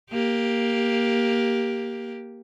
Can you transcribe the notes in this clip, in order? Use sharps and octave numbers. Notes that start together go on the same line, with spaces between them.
A#3 G4